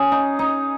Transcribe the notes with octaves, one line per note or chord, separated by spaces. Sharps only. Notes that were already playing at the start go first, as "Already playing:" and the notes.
Already playing: C#4 G#4
D#4
D#4